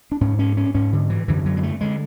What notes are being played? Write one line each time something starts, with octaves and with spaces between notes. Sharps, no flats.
D4
G#2 C#4
C#4
C#4
G#2 C#4
D3
E3
F#2 D3 E3
F#3
G#3
A3
D3 G#3